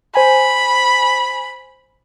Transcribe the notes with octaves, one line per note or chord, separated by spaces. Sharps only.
C5 G#5 B5